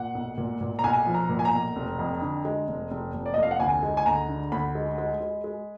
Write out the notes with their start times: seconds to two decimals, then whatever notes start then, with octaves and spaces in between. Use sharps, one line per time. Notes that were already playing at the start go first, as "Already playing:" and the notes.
Already playing: A#2 F#5
0.15 B1
0.38 A#2
0.61 A#2
0.79 A#5
0.84 B1 G#5
1.06 F3
1.14 A#5
1.29 A#2
1.39 G#5
1.45 A#5
1.53 B1
1.76 F1
1.99 F2
2.22 D3
2.45 G#3
2.68 F1
2.91 F1
3.14 F1
3.26 D5
3.34 F1 D#5
3.43 F5
3.51 F#5
3.60 D2 G#5
3.83 G#3
3.97 G#5
4.06 D2 A#5
4.29 D3
4.52 D2 B5
4.75 G#3
4.98 G#3
5.21 G#3
5.44 G#3